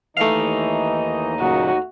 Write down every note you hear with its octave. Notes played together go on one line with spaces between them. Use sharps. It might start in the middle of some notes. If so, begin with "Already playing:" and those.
D#2 E3 A3 D#4 D#5 F5
A#2 C#3 F#3 F#4